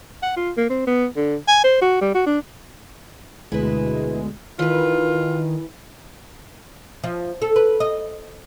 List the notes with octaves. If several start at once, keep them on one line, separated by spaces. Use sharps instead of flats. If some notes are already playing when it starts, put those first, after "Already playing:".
F#5
F4
A#3
C4
B3
D3
G#5
C5
F#4
G3
F#4
D4
D2 B2 G#3 E4 B4
D#3 E3 F4 B4
F3
A4
B4
D#5